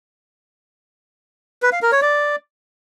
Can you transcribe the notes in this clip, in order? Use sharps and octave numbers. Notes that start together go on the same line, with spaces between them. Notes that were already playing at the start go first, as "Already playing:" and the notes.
B4
F5
A#4
C#5
D5